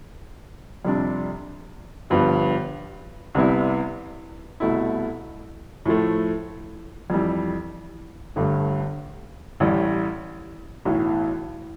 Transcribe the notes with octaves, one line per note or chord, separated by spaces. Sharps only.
F2 C3 G3 D4
G1 G2 F3 B3
C2 C3 G3 B3 E4
C2 B2 A3 E4
A2 F3 A3
F2 E3 G3
G1 G2 D3 A3
A1 A2 G3
B1 A2 E3